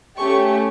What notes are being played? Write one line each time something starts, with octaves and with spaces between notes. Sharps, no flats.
A3 C#4 G4 C#6